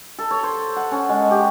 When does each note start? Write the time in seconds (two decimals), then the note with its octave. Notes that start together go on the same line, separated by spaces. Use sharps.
0.18 A4
0.31 C#5
0.43 C5
0.76 F#5
0.91 C#4
1.09 G#3
1.31 G4